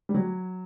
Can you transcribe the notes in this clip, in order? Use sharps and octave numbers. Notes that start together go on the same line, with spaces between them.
G3
F#3